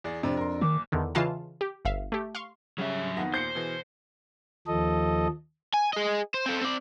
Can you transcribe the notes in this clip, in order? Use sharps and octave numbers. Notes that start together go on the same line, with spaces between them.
E2 G#4 D5
F2 C3 D4
A#4 C6
F#1 D#3 D6
E2 D3 D#3
C#3 E3 F4 D#5 F5 A5
G4
G1 E5 F5
A3 G4
F5 C6 C#6
C#3 F#3 G3 C#4 E5
F2 D#3 B3 F5 A#6
D#2 A#2 C5 G6 C7 C#7
B2 E3 G#4
D#2 F3 A4 D#5
G#5
G#4 D#5
C5
C4 A4
C4 D5